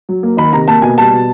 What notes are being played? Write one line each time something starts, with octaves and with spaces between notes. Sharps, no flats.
F#3
A#3
D#3 B5
C3 A#5
A#3 A5
B2 G#5
G3 A5
B2